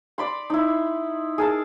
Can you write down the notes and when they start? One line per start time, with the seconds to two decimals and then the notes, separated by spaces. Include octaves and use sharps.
0.18 D5 B5 C6
0.50 D#4 E4
1.38 G#4 A#4 A5